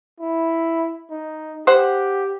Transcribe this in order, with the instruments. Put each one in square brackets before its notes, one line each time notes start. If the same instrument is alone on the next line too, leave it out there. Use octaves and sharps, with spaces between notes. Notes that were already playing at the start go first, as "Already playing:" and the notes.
[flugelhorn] E4
D#4
[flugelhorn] G4 [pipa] C5 F#5